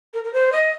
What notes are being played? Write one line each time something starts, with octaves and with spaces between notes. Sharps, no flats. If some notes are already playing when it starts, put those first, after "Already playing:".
A#4
A#4
C5
D#5